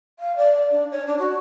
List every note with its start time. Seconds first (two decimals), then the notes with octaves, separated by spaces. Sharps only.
0.19 F5
0.36 D5
0.71 D4
0.91 C#5
1.07 D4
1.18 F#4